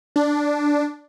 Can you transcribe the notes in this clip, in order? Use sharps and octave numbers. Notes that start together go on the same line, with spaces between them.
D4